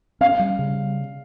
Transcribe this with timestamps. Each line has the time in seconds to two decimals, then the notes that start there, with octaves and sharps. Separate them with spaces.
0.21 C#4 F5
0.39 G3
0.59 C#3